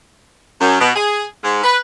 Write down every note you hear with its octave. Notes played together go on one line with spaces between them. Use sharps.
F#2
B2
G#4
G#2
B4